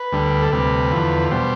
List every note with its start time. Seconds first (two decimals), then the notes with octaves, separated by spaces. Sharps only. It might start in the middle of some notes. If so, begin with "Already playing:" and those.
Already playing: B4
0.12 D2 D3 G3
0.42 A4
0.52 D2 C3 G3 B4
0.91 E2 D3 F3
1.31 B2 G3 C5